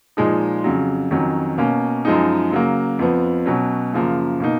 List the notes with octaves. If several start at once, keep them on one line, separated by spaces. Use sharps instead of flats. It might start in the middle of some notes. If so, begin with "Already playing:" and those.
A#2 F3 G#3 D#4
F2 C#3 F#3
F2 D#3 F#3 C#4
B2 A#3 C#4
F#2 F3 G#3 D#4
C#3 F#3 A#3
F2 F3 B3
B2 F#3 C#4
F#2 C#3 F3 A#3
B2 A#3 D#4